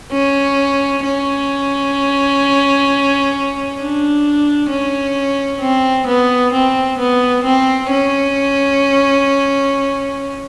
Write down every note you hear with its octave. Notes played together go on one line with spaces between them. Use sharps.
C#4
C#4
D4
C#4
C4
B3
C4
B3
C4
C#4